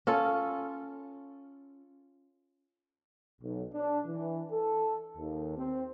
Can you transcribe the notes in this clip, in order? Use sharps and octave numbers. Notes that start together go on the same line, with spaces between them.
C#4 F4 A4
B1
D4
E3
A4
D#2
C4